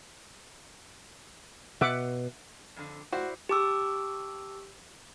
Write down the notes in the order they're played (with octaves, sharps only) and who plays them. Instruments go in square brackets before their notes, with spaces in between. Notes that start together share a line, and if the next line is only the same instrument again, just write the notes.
[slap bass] B2 [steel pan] E5 F#5 D6
[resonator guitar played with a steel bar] F2 D3
[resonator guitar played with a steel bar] E4 C5 D5 [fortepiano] F#4
[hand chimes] G4 A5 D6 E6